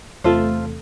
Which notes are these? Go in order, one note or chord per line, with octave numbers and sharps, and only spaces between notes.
E2 C3 A3 F4 A4 C5